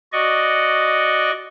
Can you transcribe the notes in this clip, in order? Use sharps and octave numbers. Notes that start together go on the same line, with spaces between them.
F#4 D5 D#5 C#6